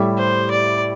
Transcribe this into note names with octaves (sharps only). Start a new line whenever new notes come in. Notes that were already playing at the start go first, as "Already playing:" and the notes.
Already playing: A2 G3 E4 G4
C5
D5